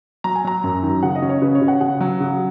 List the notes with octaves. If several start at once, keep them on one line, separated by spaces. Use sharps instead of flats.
F#3 A#5
G#5
F#3 A#5
F#2
D#3
C#3 F#5
D#5
C#4
C#5
C#3 B4
C#5
C#3
F#5
C#3 F#5
F#3
C#3